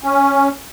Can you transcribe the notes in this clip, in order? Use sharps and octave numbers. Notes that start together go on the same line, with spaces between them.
C#4